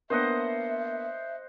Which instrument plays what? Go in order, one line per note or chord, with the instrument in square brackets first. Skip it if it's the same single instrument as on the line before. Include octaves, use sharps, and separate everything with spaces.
[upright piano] A#3 B3 D4 [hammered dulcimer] C5 D#5 F#5 [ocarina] E5